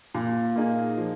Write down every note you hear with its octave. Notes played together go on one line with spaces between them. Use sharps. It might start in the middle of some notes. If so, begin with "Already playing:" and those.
A#2
A#3 D#4 G#4
F3